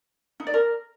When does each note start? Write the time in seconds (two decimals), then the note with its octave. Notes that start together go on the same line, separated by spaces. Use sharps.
0.40 D#4
0.47 D5
0.54 A#4